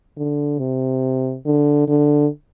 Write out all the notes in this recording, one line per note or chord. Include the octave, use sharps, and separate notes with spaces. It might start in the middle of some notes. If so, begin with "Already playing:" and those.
D3
C3
D3
D3